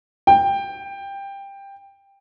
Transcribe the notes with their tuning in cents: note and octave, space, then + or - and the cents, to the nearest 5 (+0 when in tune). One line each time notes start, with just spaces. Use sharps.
G5 +15